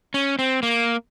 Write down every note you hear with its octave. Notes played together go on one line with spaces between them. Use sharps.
C#4
C4
A#3